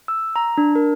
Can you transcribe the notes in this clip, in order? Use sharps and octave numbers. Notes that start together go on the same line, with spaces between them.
E6
A#5
D4
A#4